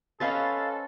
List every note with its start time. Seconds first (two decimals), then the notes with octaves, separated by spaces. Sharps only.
0.20 C#4 A4 B4 C5 D#5 F5 A6